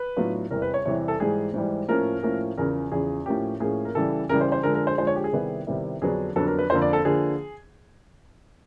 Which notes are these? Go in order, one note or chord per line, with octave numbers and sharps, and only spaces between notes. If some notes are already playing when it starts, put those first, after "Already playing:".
Already playing: B4
A2 F#3 B3 D4 F4
E2 C3 E3 G3 A#4
B4
C#5
E2 C3 E3 G3 C#5
A4
G#2 E3 G3 G#4
G#2 E3 G3
A2 F3 A#3 C#4 A#4
A2 F3 A#3 C#4
E2 C#3 F3 A#4
E2 C#3 F3 G#4
A2 F3 A#3 C#4 G4
A2 F3 A#3 C#4 G#4
A#4
C#3 E3 G3 A4
C#3 E3 G3 A#4
C5
C5
D3 F3 G#3 A#4
A#4
C5
D3 F3 G#3 C5
C#5
G4
G#4
C3 D#3 G3 B3 E4
C3 D#3 G3 B3 E4
F2 D3 F#3 B3 D4 G#4
F2 D3 F#3 B3 D4 A4
A#4
B4
F2 D3 F3 A#3 C5
D5
A4
D3 F3 A#3 G#4